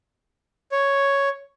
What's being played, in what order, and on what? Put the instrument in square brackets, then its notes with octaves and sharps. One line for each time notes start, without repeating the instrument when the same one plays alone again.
[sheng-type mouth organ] C#5